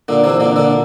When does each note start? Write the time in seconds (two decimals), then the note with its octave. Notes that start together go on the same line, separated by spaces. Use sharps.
0.08 A#2 D3
0.24 C3 E3
0.40 A#2 D3
0.56 A#2 D3